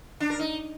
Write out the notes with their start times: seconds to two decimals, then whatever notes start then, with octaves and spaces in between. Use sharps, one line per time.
0.20 D4
0.30 A#4
0.39 D#4